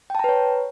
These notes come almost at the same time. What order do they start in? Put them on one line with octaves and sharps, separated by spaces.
G5 A5 A#5 B4 C#5